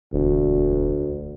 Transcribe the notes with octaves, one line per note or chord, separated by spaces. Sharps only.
E1 D2